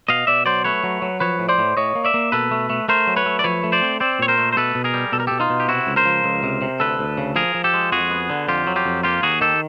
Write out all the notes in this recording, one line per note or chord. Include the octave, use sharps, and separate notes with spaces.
B2 D#5 F5
B2 D5 E5
F#3 C5 D5
A3 B4 C#5
F#3
F#3
F3 B4 C#5
A2
C5 D5
A2
A2 C#5 D#5
A#3
D5 E5
A#3
B2 A4 B4
A3
A3
A3 A#4 C5
F#3
B4 C#5
A3
D5
F3 B4 C#5
A3
C5 D5
C4
C4 C5 D5
A#2 C#5
A#4 C5
A3
C5
B2 A4 B4
B2
G#4 A#4
G3
B2 A4
A#4
B2 G4 A4
D#4 F4
B2
G4
C3 E4 F#4
C#2
A#4 C5
F3
C#2
C3
C3
D2 A4 B4
D2
C#3
F3 G#4 A#4
F3
G4 A4
G#3
F2 F#4 G#4
B3
D3
F2 F4 G4
F#3
F4 G4
F2
A#3 F4 G4
D#2 F#4 G#4
D#3 G4 A4